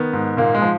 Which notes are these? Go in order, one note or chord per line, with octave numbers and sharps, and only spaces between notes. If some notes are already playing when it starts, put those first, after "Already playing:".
Already playing: D#3 B3
G#2
A#2 A#3
G#3
F3